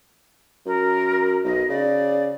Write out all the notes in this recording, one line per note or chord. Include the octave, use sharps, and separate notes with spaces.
F#2 A#4
B1 D#5
C#3 D5